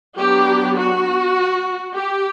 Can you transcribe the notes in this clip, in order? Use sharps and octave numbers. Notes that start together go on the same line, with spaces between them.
F#3 B3 D4 G4
F#4
G4